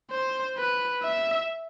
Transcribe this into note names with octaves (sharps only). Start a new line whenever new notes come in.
C5
B4
E5